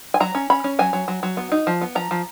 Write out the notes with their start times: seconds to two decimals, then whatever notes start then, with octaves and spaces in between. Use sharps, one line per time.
0.14 G#5
0.20 F#3 A#5
0.35 C#4
0.50 C#4 B5
0.64 C#4
0.79 F#3 G#5
0.93 F#3
1.08 F#3
1.23 F#3
1.37 B3
1.52 D#4
1.67 F3
1.81 B3
1.95 F3 A#5
2.11 F3